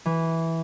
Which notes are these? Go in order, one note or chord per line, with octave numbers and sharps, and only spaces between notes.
E3